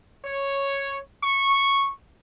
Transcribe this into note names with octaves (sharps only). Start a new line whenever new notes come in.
C#5
C#6